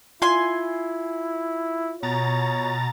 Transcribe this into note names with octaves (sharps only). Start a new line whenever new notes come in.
E4 F4 G#5 C6
B2 C#5 A#5 A6